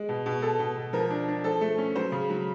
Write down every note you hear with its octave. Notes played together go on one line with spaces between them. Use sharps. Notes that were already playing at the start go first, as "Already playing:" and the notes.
Already playing: G#3
B2
B2
B2 A4
B2
B2
F3 A#4
D4
D4
F3 A4
A3
C#4
F#3 C5
C#3
F#3